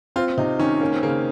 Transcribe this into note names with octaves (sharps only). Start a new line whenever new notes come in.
C4 F4
C3 D#4
D#3 C#4
A#3 C#4
C4
C#3 A#3